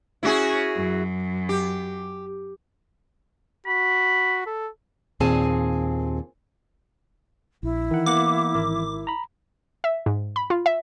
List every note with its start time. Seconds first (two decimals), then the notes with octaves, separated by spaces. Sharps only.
0.23 C#4 E4 F#4 G#4
0.75 F#2
1.49 G4
3.66 F#4 B5
4.46 A4
5.20 D#2 A#2 C4 G#4 G#5 A5
7.63 A#1 E4
7.91 D#3 E3 F#5
8.06 A#3 B3 F#5 D6
8.54 G#1 A#4
9.07 A#5 B5
9.84 E5
10.06 G#2
10.36 B5
10.50 F4
10.66 E5